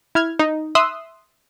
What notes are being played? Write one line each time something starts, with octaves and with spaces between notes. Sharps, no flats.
E4 F6 G#6
D#4
E5 C6 D#6 E6 F#6